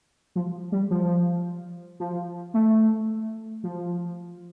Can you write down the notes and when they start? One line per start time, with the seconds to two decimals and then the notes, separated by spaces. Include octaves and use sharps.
0.36 F3
0.72 G3
0.90 F3
2.00 F3
2.54 A3
3.63 F3